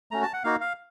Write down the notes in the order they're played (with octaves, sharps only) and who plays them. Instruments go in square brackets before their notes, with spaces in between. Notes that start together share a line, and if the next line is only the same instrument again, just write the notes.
[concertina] A3 C#4 F#4 A#5
A5
F#5
A#3 D#4 F#4 F5
F5